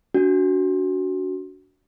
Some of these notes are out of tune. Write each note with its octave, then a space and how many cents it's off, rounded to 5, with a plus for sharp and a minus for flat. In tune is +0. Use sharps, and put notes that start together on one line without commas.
D4 -30 F#4 +5